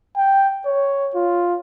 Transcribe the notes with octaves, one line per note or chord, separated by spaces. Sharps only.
G5
C#5
F4